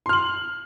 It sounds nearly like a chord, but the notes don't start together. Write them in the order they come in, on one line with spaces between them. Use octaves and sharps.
C6 F6 F#7